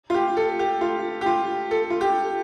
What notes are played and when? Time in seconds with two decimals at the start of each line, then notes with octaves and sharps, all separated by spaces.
0.10 F4
0.14 G4
0.37 A4
0.59 G4
0.81 F4
1.21 G4
1.26 F4
1.71 A4
1.90 F4
2.01 G4